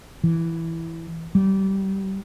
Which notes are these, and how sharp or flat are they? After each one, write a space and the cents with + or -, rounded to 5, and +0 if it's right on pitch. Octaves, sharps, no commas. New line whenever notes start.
E3 +0
G3 -25